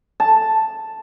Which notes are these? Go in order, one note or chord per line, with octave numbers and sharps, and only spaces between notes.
A5